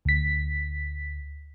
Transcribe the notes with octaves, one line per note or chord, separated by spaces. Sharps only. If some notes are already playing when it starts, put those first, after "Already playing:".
D2 B6